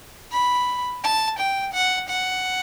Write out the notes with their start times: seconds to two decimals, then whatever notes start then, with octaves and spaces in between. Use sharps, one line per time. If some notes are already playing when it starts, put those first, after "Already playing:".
0.32 B5
1.04 A5
1.39 G5
1.74 F#5
2.09 F#5